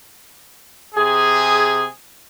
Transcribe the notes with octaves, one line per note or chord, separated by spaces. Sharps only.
C3 G#4